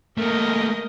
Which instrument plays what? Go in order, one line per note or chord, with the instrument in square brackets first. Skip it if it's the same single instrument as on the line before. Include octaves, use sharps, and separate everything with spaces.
[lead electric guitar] A3 A#3 [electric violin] A#4 D#5